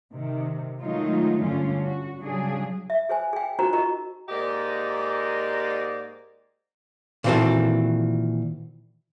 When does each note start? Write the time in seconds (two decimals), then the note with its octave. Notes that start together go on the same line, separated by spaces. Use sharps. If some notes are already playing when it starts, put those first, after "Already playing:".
0.13 C3 D#3
0.81 D#3 F#3 G#3 A3 D#4 F4
1.42 G2 D3 C#4 F4
1.83 F#4
2.18 C#3 F#3 G3 D4 G#4
2.90 E5
3.09 G#4 C5 G#5
3.33 G#4 G5
3.59 D#4 F4 F#4 A#4 C5 A#5
3.73 F4 G4 A#4 D#5 A#5
4.29 G#2 A#3 G4 D5 D#5
7.24 A#2 D#3 E3 C4 F#4 A4